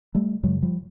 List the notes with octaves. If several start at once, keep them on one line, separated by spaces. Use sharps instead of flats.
G3 A3
F#2 C#3 F#3 G#3
F3 G3